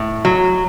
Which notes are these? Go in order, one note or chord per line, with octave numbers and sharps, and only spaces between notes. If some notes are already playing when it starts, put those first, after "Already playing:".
Already playing: A2
F#3